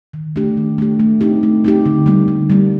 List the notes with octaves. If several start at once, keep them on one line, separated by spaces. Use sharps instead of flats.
D#3
A3 D4 G4
D#3
A3 D4 G4
A3
C4 D#4 G4
A3
C4 D#4 G4
D3
G3 A#3
D3
G3 A#3